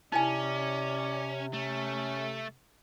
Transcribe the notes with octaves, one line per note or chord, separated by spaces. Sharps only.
C3 C#4 D#4 E4 D5 G#5
A3 C#4